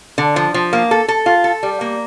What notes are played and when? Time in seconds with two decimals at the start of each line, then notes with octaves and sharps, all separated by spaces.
0.18 D3
0.36 F3
0.54 F3
0.73 A#3
0.91 A4
1.08 A4
1.26 F4
1.44 A4
1.63 G3
1.81 A#3